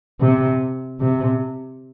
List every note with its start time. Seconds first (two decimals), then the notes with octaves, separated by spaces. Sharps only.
0.21 C3
1.01 C3